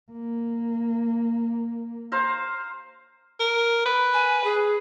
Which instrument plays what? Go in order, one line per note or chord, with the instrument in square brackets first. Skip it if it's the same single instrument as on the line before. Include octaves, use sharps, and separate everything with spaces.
[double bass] A#3
[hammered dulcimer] C5 F5 A#5
[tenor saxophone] A#4
B4
[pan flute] G#5
G#4